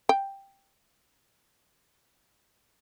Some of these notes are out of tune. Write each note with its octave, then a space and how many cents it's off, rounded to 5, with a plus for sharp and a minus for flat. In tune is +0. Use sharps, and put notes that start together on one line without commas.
G5 +5